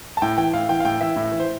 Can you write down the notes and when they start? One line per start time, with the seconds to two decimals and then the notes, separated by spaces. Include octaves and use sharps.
0.17 A5
0.22 A2 G5
0.38 E3 G5
0.53 A2 F5
0.69 E3 G5
0.80 F5
0.85 A2 G5
1.01 E3 E5
1.16 A2
1.32 E3
1.40 C5